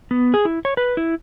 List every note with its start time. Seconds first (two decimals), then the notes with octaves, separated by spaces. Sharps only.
0.11 B3
0.34 G#4
0.45 E4
0.65 C#5
0.77 B4
0.97 E4